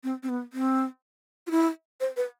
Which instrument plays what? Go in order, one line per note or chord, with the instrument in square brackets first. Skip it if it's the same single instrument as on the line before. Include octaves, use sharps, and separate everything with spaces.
[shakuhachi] C4
C4
B3
C4
F4
E4
C5
B4